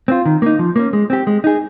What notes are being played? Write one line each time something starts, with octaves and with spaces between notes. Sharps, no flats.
C4 F4
D#3
A#3 D#4
F3
A#3 C#4
G#3
C4 G4
G#3
D#4 G#4